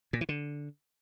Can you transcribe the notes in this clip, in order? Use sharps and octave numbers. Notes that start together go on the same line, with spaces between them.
A#2
E3
D3